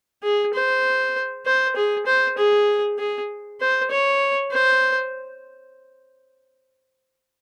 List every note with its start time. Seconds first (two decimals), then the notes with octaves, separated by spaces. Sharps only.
0.24 G#4
0.54 C5
1.46 C5
1.76 G#4
2.07 C5
2.38 G#4
2.99 G#4
3.61 C5
3.91 C#5
4.52 C5